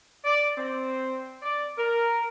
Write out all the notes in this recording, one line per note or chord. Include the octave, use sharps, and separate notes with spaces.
D5
C4
D5
A#4